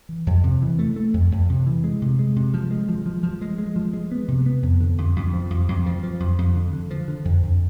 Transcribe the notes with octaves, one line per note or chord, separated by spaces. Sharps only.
E3
F2
C3
E3
A3
A3
F2
F2
C3
E3
G#3
C3
G#3
C3
F3
G#3
F3
F3
F3
G#3
G#3
F3
G#3
B3
C3
B3
F2
D3
F2
F2
F3
F2
F2
F3
F3
F2
F2
D3
D3
F3
D3
F2
F2